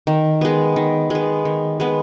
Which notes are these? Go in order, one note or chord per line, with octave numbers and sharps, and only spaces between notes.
D#3
G#3 B3
D#3
G#3 B3
D#3
G#3 B3